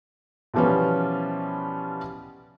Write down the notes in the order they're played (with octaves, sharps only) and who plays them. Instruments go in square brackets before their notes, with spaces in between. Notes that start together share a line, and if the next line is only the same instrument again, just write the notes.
[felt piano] B2 E3 F3 G3 B3 C#4